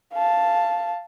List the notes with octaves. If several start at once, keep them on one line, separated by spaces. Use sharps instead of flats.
F5 A5